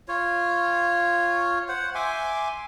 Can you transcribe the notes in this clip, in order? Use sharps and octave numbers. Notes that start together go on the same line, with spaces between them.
F4 C#5
C5 F#5
E5 G#5 C6 D6